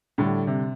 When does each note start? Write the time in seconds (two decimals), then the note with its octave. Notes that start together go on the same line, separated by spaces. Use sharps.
0.18 A2 D3 G3 D4
0.47 C3